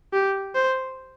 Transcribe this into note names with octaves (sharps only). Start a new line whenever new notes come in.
G4
C5